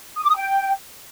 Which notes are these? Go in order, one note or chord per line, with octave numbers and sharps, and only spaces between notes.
D#6
D6
D#6
G5